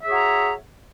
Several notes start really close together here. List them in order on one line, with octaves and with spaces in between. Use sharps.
E5 G#4 C#5 F#4 A#5